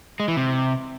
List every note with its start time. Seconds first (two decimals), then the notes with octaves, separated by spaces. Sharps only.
0.20 G#3
0.28 E3
0.37 C3